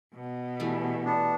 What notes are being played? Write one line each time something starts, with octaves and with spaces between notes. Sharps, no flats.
B2
E3 G3 A3
B3 D4